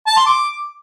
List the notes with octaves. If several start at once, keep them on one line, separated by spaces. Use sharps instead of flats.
A5
C6
D6